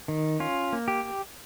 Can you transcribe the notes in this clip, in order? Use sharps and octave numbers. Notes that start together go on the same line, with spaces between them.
D#3
C#4 F4
A#3
G4